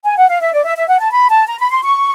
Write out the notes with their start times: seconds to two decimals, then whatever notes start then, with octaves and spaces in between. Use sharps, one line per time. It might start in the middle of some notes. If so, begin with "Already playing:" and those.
0.05 G#5
0.17 F#5
0.29 F5
0.41 E5
0.53 D5
0.65 E5
0.76 E5
0.88 F#5
1.00 A5
1.12 B5
1.30 A5
1.47 A#5
1.59 B5
1.71 C6
1.83 C#6